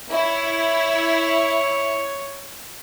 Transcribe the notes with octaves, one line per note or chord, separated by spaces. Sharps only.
E4 C#5